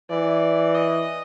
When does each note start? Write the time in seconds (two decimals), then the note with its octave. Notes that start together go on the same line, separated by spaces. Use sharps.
0.10 E3 D5
0.74 D#5